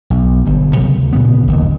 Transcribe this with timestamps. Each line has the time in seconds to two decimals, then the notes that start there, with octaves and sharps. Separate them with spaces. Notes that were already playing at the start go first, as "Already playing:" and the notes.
0.10 B1
0.45 G1 G2
0.75 C3 F#3 G3 B3
0.97 D2
1.13 A#2 C#3 B3
1.47 F#1 D#2